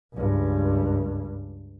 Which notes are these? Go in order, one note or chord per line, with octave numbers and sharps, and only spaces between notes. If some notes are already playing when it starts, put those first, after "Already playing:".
C#2 G2